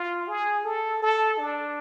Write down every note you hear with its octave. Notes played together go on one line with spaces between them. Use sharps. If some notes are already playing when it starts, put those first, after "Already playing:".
Already playing: F4
G#4
A4
A4
D4